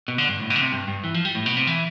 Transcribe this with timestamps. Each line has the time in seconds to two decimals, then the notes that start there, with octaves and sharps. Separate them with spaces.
0.08 B2
0.18 D3
0.29 G2
0.40 A2
0.50 B2
0.56 D3
0.61 C3
0.72 G2
0.88 G2
1.04 E3
1.14 F3
1.25 G3
1.35 A2
1.46 B2
1.57 C3
1.67 E3